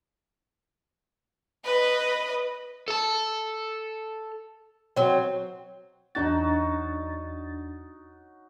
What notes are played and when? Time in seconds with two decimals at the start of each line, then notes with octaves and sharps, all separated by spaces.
1.65 B4 D#5
2.88 A4 A5
4.96 F#3 C4
6.15 E2 F#3 D4 D#4 F#4 A6